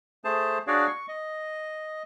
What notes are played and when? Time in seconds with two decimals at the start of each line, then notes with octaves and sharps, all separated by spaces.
0.24 A3 G#4 C5 A5
0.67 D4 F#4 G#4 C#5 D5 F5
0.87 C#6
1.08 D#5